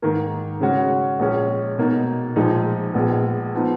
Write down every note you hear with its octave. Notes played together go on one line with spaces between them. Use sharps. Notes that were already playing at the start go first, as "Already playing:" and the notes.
G#2 D#3 A#3
C#3 G#3 C#4 F#4
A#1 A#2 G#3 C#4
B2 A#3 D#4
A#1 A#2 F3 G#3 D#4
A#1 A#2 G#3 B3
F3 B3 D#4